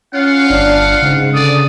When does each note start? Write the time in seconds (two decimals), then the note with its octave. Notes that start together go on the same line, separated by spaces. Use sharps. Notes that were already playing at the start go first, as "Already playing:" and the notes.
0.14 C#4 F4 F5 F#5
0.50 G1 D4
1.02 G#2 C#3
1.34 D3 D5 D#6